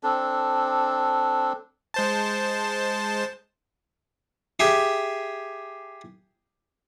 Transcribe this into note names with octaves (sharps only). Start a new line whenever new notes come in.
C4 D4 A4
G#3 C5 A5
G4 G#4 E5